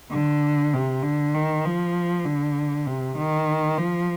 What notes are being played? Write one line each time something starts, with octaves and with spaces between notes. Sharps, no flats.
D3
C3
D3
D#3
F3
D3
C3
D#3
F3